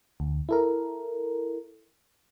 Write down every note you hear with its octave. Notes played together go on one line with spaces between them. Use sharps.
D2
E4 A4 A#4